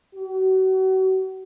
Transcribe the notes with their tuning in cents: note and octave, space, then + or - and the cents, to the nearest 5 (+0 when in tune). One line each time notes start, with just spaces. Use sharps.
F#4 +35